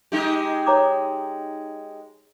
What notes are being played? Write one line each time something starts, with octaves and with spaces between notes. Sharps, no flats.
G#3 D#4 G4
C#5 A#5 D6